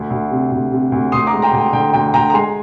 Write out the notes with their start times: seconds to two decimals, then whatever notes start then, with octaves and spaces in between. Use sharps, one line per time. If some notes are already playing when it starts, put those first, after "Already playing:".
Already playing: D2
0.10 D2
0.31 C3
0.52 D2
0.72 C3
0.92 D2
1.12 D2 C6 D#6
1.27 A#5 D6
1.33 G#3
1.42 G5 A#5
1.53 D2
1.58 G5
1.72 D3 G5
1.93 D2 G5
2.13 D2 G5 A#5
2.30 A#5
2.33 G#3 G#5 C6